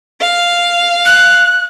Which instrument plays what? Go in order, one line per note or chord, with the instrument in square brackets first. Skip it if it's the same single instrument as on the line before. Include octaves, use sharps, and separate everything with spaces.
[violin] F5
[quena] F#6